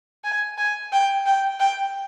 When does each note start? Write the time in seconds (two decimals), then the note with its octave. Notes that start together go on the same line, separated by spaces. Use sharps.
0.24 G#5
0.58 G#5
0.92 G5
1.26 G5
1.60 G5